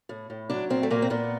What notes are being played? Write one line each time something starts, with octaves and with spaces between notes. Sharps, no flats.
A2
A2
F#3 D4
A#2 C4
A3
A#2 A#3
C4
A#2 B3